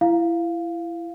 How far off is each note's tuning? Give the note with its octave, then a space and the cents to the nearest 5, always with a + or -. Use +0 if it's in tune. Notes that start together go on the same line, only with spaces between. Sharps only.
E4 +25 F5 +0